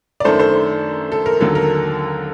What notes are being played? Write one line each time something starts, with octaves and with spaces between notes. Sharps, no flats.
D5
F#2 D#3 A3 D4 A4 C5
A4 C5
A4
A#4
D#2 D3 F#3 A4
A#4